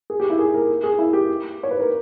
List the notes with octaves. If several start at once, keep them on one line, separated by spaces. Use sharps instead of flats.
G#4
G4
E4
G#4
A#4
G#4
E4
G4
C#5
B4
A#4